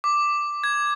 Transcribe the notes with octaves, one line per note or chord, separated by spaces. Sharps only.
D6
G#6